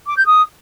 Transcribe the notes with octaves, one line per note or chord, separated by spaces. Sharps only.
D6
G6
D#6